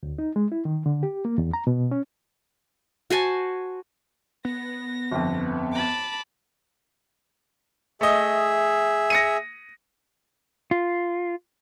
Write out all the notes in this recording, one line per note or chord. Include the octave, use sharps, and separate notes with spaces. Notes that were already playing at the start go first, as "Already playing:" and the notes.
D2
D#4
G#3
E4
D#3
D3
G4
A#3
E2
A#5
B2
C#4
F#4 C5 G#5 A5
B3 A#6
G1 F2
A5 B5 D6
A3 G#4 D#5 E5
A#6 C#7 D#7
F4